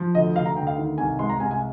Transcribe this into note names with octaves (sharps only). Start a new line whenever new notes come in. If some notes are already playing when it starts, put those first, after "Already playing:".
Already playing: F3
D2 D#5
D2 F5
A#5
D2 G5
F5
D#3
C2 G#5
G#3 C6
A#5
C2 G#5
G#5